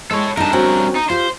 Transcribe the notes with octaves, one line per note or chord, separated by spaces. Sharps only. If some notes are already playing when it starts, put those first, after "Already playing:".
G#3 A4 C#5
G2 D#4 A#4 A5
C4 C#4 F#4
D#4
F4 G4 C5